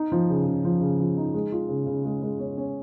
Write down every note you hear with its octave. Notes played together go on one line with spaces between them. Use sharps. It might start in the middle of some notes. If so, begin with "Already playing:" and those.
Already playing: D#4
F3
C#3
C#3
F3
C#3
F3
D#4
G#3
F4
C#3
C#3
G#3
G#3
C#4
C#4